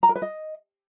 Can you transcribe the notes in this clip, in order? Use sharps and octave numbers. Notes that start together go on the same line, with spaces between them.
A#5
A#4
B4
D#5